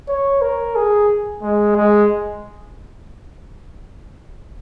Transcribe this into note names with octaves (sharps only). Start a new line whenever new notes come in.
C#5
A#4
G#4
G#3
G#3